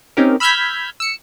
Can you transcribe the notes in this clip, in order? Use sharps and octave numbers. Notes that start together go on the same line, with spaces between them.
C4 C#4 D#4 G4 A#4
B5 E6 F6 G6 G#6 B6
E6 C#7